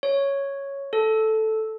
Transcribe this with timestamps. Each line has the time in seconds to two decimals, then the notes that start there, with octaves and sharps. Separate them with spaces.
0.03 C#5
0.93 A4